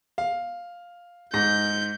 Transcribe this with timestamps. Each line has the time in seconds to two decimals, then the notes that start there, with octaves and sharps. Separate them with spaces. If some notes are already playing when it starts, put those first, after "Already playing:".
0.18 F5
1.34 G#2 G6 A#6